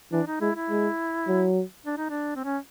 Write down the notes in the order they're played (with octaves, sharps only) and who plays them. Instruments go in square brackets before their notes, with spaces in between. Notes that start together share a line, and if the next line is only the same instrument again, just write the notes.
[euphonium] E3 [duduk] D4
[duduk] D#4
[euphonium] G#3 [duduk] E4
[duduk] E4
[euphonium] G#3
F#3
[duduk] D4
D#4
D4
C4
C#4